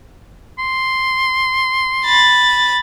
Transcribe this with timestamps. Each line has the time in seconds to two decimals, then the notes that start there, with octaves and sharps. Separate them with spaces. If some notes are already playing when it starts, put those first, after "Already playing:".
0.59 C6
2.05 B5 A6